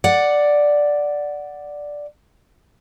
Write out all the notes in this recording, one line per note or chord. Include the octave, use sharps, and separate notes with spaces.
D5 F#5